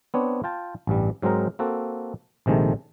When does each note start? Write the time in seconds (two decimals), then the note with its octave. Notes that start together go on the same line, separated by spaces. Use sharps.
0.14 B3 C4 D4 C#5
0.44 F4 G5 A5
0.87 A1 G2 G3
1.22 G#2 F#3 G#3 C4 D#4 A#4
1.59 A#3 C4 F#4 A4
2.46 A#1 C3 D#3 G#3 A3